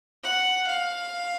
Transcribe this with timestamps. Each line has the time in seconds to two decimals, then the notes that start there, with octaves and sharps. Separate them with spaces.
0.24 F#5
0.67 F5